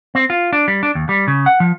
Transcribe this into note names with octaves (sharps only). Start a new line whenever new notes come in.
C4
F4
D4
G3
D4
D#2
G3
C#3
F#5
F3